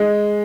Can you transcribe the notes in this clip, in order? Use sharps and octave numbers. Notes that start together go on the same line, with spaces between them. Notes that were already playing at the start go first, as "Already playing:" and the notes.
Already playing: G#3